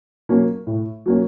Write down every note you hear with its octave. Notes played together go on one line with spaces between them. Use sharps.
F#3 A#3 C#4
A2
F#3 A#3 C#4